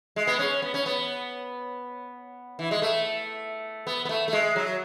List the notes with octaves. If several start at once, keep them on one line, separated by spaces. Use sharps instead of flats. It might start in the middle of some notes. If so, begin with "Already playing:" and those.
G#3
B3
C#4
B3
C#4
B3
E3
G#3
A3
B3
B3
A3
A3
G#3
F#3